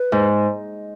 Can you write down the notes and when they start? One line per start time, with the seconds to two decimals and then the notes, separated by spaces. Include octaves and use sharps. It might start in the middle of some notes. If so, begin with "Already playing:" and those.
Already playing: B4
0.12 G#2